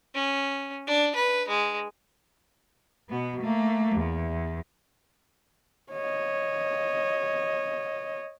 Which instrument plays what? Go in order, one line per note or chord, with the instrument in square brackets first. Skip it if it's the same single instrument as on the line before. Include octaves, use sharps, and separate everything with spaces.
[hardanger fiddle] C#4
D4
B4
G#3
[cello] B2 B3
A3 A#3
E2
[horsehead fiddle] C#5 D#5